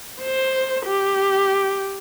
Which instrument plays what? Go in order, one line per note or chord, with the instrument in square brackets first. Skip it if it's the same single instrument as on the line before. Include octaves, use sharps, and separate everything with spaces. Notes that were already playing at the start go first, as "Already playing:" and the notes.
[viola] C5
G4